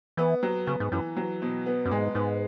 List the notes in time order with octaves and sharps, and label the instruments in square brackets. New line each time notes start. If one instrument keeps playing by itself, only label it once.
[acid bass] E3 [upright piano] B3
[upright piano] F#3
[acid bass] C#3 [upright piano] B3
[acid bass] G#2
[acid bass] F#2 [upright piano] E3
[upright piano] F#3
B2
B3
[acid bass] F#2
[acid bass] G#2 [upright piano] G#3
[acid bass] G#2 [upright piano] B3